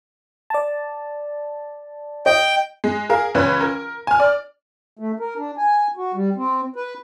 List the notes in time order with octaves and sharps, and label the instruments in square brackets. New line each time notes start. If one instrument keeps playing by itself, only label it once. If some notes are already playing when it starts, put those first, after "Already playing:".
[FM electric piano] D5 A5
[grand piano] D#5 [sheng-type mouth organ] G5
[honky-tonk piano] G#3
G#4 A#4 F5
C#2 E3 C#4 B4 B5
A#4
G#5 F6
D5
[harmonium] A3
A#4
D4
G#5
F#4
G3
C4
B4